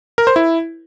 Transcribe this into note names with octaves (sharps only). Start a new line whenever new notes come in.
A#4
C5
E4